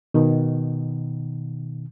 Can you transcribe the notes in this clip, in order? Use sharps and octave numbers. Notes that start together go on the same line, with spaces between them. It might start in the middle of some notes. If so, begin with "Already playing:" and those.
B2 D#3